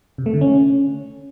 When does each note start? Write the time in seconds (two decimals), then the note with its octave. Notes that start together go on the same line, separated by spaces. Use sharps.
0.18 C3
0.26 A3
0.34 D3
0.41 C#4